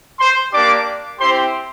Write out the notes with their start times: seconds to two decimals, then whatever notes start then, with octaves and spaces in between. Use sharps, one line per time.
0.19 C5 C6
0.53 A#3 D4 G4 D5 D6
1.20 C4 E4 G4 C5 C6